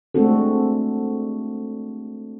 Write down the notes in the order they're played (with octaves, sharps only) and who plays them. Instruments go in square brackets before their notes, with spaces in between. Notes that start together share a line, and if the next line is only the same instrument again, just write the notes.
[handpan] G#3 A3 C4 D4 F#4 A4